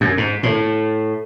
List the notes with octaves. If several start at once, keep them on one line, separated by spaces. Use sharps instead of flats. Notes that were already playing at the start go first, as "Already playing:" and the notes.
F#2
G#2
A2